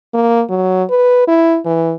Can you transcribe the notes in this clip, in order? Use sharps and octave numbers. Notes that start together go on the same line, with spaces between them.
A#3
F#3
B4
E4
E3